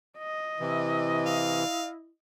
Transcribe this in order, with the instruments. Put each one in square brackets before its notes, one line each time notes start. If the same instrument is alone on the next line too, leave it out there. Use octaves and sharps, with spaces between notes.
[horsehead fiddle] D#5
[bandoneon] C3 E3 [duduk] E4
[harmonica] F5